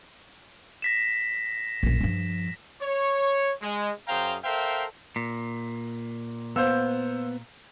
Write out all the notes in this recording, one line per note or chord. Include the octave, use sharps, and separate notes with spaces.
A#6 B6 E7
A#1 F#2
G2 F3
C#5
G#3
F#2 G#4 C5 F5 G5 A#5
A4 A#4 C5 E5 F5 G5
A#2
B3 C5 F5 E6